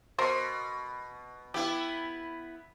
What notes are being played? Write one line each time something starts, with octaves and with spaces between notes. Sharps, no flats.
B2 A#4 C5
B3 E4 G4